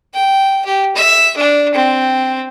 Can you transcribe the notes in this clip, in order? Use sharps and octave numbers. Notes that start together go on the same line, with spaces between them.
G5
G4
E5
D4
C4